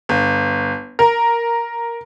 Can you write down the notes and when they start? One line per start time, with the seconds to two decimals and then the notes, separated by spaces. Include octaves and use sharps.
0.09 G1
0.99 A#4